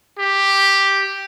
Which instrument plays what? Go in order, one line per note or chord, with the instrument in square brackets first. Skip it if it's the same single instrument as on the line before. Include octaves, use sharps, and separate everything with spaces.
[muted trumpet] G4